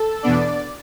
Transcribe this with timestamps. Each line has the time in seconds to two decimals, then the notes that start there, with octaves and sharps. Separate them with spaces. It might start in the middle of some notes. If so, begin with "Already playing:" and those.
Already playing: A4
0.23 E2 B2 B3 D4 D5